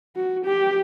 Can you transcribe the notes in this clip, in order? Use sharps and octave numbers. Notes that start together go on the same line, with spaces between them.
F#4
G4